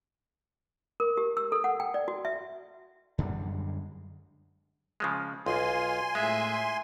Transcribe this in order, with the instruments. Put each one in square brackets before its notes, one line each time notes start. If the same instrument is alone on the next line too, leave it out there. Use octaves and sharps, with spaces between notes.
[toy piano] A#4
G4
E6
A4
F#5
G5
D5
F#4
E5
[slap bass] F#2 D3 G3 G#3
[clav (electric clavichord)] C#3 F3 G#3
[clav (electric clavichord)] B1 [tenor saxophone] F4 [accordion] G#5 C6
[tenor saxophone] A2 [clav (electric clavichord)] G#3 [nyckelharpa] E5